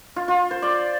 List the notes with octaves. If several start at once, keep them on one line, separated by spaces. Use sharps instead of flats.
F4
F4
C5
D5